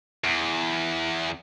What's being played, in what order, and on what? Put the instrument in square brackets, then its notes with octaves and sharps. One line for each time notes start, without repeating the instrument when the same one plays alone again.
[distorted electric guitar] E2